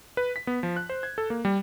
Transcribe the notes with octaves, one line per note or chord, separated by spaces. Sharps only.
B4
B6
B3
F3
F#6
C5
G#6
A4
A#3
G3